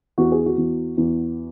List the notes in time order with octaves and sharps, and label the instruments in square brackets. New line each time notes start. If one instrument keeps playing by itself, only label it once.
[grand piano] E2 F#4
G#4
F#4
E2
E2